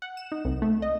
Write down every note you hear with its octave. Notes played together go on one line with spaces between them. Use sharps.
F#5
E7
D#4
C2
A3
D#5